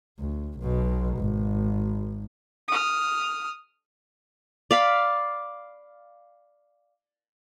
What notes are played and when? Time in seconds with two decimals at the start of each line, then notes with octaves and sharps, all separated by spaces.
0.20 D2
0.60 B1 B2
1.18 G#1
2.68 D#6 F6
4.71 D5 F5 B5